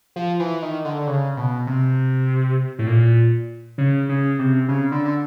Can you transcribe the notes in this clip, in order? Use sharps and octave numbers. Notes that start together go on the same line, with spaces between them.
F3
E3
D#3
D3
D3
C#3
B2
C3
A2
A#2
C#3
C#3
C3
C#3
D3
D3